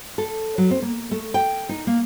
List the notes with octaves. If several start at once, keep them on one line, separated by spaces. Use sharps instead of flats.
A4
F#3
C4
A#3
A3
G5
D#4
A#3